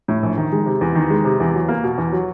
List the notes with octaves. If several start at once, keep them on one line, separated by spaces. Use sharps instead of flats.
A2
A#1
D#3
G#3
C3
E2
D#3
G#3
C3
E2
F#3
A#3
B2
E2
F#3